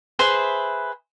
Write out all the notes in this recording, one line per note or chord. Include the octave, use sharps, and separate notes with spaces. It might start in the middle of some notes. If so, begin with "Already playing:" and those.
G#4 B4 C5 E5